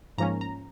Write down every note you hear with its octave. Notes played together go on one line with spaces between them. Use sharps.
G#2 F3 A#3 C#4 A#5
A#5